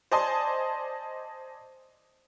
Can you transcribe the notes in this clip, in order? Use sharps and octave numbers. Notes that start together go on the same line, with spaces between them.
C5 D5 D#5 G#5 A5 C6